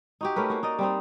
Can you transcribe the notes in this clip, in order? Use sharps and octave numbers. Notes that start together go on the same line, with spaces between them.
D#4 F#4 G4
A3 C#4 A#4 B4
A#3 F#4
D#4 D5 D#5
G3 C4 D#4